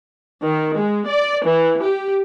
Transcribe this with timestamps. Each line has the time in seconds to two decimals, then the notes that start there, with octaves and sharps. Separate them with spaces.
0.44 D#3
0.78 G#3
1.08 D5
1.45 E3
1.82 G4